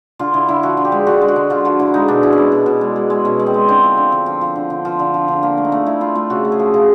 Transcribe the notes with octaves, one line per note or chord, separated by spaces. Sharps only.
D3 F4
D3 E4
D3 E4
F3 F#4
D3
G4
G#3
D3 F#4
G#3
F#4
D3
D3 F4
F3 F#4
D3 E4
G#3 D#4
B2 D4
B2 E4
C#4
G#3 D4
B2
B2
G#3
G#3
G#3
B2 C#4
G#3
C4
G#3
D3 C4
F3
D3
D3
F3
F3
D3
D3
F3
D3
F3
D3
F3 A#3
A3
D#4
A3
A3 E4
A3 F4
A3 F4
C#3 F#4
A3
G#4
F3
C#3 G#4